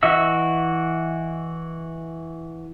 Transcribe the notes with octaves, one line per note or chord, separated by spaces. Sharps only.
E3 F#4 D#5 E5 E6